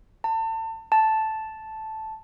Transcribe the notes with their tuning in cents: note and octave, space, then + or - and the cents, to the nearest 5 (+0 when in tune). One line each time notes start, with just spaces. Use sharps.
A5 +30
A5 -5